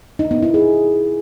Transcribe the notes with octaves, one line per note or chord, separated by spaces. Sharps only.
D#4
B3
E4
G#4